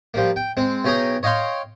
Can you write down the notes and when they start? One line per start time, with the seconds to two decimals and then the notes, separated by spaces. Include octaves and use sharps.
0.14 F3 G3 A#3
0.36 G5
0.57 G#3 C4
0.85 B1 C#4 G#4 G5 A#5 D#6
1.23 C#5 D#5 F5 G5 C6